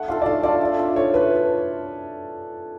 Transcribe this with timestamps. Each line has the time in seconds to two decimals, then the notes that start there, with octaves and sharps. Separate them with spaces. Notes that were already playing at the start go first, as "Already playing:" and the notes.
Already playing: A3 F#5
0.08 D4 F4 A4 F5
0.22 D5
0.26 A3 F5
0.43 D4 F4 A4 D5
0.61 A3
0.79 D4 F4 A4
0.96 A3 C#5
1.14 D4 F4 A4 B4